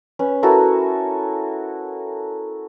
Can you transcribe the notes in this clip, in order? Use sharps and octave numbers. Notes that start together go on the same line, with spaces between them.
C#4 B4
E4 F#4 A4 A#4